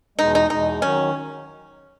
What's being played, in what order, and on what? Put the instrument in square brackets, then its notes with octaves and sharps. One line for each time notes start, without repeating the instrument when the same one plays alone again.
[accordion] E2 B2 G#3 [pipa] D#4
[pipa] D#4
[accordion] E2 B2 G#3 [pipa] D#4
[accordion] D#3 F#3 [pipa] C#4